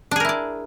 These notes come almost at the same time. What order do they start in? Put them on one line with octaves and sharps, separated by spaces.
D4 G#4 A#4 E4 D5